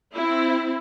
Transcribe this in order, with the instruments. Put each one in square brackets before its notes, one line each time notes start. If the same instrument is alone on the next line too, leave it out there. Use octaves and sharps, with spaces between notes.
[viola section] C4 E4